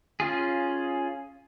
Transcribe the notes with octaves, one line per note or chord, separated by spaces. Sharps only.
C#4 F4 G#4